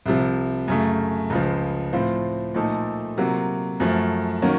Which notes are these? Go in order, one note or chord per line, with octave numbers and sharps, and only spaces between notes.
C2 C3 F3
F#2 C#3 A3
C#2 C#3 F3
A2 F3 C4 F4 C5
A#2 F3 A3 D#4 A4
C3 F#3 A#3 F4
F#2 F3 A3
D#3 F#3 A#3 C#4